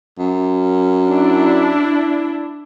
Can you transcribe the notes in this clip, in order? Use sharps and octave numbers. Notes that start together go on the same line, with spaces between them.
F#2
D4 E4